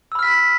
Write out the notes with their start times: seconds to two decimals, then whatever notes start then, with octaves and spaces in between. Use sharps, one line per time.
0.12 E6
0.15 B5
0.19 F6
0.23 B6